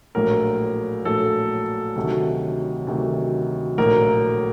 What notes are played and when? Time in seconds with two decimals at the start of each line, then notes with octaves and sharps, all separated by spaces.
0.15 A#1 A2 F#3 A#4
1.05 A#1 A2 F#3 A4
1.96 D2 C3 D#3 F#3
2.87 D2 C3 D#3 F#3
3.78 A#1 A2 F#3 A#4